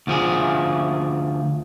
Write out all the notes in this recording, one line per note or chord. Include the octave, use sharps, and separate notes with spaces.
D2 F3 G#4